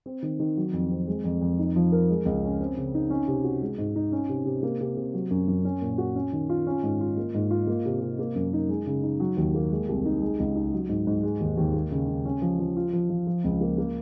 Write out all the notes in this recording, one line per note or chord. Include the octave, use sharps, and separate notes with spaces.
C4
D#3
D#3
F#3
F2
C4
G#3
F2
F2
D#4
F3
A#4
G#3
C#2
C#4
C4
C#3
D#4
C#4
C3
F#4
G#3
G#2
D#4
C#4
C3
C3
A#3
C3
C3
F#3
F#2
F#2
C#4
A#2
F#4
C#4
D#3
F4
C#4
G#2
F4
A#3
G#2
F4
A#3
C3
C3
A#3
F#2
D#4
G#3
C#3
D#4
F#3
D#2
A#3
G#3
C2
D#4
G#3
C#2
D#4
F#3
G#2
G#2
G#3
D#2
D#2
A#3
C#3
C#3
C#4
F3
F3
F4
F3
F3
F3
C#2
A#3
A#3